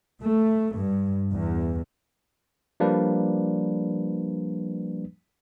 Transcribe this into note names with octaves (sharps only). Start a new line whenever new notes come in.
A3
G2
E2
F3 G3 A#3 D4 B4